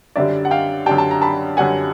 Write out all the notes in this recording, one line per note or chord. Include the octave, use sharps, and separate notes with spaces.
F#2 D3 G3 D5 E5
F#5
F5 G5
F#2 D3 G3 G5 A5
A5
A#5
A5 B5
F#2 D3 G3 F#5 G#5